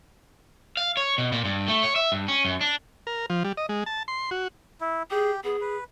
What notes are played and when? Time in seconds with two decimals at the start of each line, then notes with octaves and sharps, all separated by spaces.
0.77 F5
0.97 C#5
1.18 B2
1.32 A#2
1.45 G2
1.68 A3
1.83 C#5
1.96 E5
2.12 G2
2.28 C#4
2.45 F#2
2.61 D4
3.07 A#4
3.30 F3
3.44 G3
3.57 D#5
3.69 G#3
3.86 A5
4.08 C6
4.31 F#4
4.81 E4
5.11 G4 G#4
5.44 B3 G#4
5.61 B4